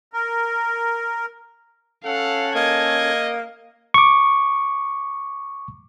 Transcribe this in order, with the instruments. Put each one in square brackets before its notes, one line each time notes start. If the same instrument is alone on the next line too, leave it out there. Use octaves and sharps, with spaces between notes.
[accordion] A#4
[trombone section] C#4 A4 [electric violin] F5 [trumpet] F#5
[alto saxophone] A#3 [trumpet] D#5 [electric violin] G#6
[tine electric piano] C#6 D6